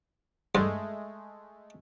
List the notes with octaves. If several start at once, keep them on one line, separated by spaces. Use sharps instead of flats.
G2 G#3 A3